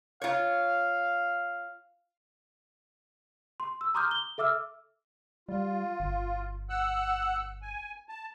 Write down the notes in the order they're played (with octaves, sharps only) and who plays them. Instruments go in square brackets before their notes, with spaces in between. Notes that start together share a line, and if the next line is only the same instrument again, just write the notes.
[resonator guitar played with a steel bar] F4 C#5 [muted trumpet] F5
[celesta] C6
E6
A#5 C6 D6 D#6 F6 G6
G7
A4 E5 D6 E6 F6
[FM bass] G3 [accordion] F4
[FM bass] G1
[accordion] F#5 E6 F#6
G#5
A5